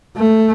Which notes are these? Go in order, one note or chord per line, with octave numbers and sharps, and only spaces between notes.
A3